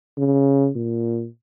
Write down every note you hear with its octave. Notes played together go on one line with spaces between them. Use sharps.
C#3
A#2